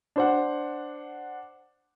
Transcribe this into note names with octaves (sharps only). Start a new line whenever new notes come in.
D4 C5 F#5